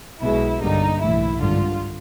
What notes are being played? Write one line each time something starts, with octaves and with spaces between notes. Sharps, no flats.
B1 B2 G#3 E4
G1 G2 D3 G3 A#3 D#4
B1 A2 E3 E4
G#1 G2 D3 F4